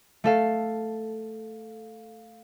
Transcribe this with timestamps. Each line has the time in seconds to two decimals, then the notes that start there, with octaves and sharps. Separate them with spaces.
0.24 A3 A4 F5